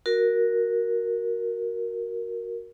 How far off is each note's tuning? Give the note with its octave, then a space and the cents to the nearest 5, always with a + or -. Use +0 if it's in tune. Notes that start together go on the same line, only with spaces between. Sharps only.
F#4 -5 A#4 +0